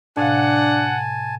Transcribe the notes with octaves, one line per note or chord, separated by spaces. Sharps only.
A2 C3 D4 F5 F#5 G#5 A5